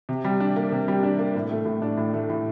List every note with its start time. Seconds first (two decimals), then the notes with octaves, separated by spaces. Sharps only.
0.09 C3
0.25 G3
0.40 D4
0.56 A#3
0.72 C3
0.88 G3
1.03 D4
1.19 A#3
1.35 A2
1.51 A3
1.66 A2
1.82 D4
1.97 A2
2.14 A3
2.30 A2